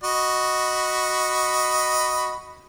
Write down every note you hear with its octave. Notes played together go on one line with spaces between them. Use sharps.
F#4 D#5 B5